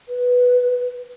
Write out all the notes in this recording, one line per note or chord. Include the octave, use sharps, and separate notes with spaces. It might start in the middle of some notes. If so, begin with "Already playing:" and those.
B4